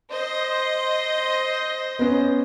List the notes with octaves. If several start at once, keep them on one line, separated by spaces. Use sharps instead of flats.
C5 D#5
B3 C#4